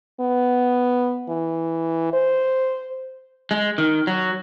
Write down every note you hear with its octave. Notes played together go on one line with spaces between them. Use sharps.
B3
E3
C5
G#3
D#3
F#3